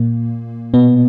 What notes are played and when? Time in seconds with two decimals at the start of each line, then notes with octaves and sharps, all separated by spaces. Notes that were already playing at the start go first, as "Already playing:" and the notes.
Already playing: A#2 A#3
0.74 B2 B3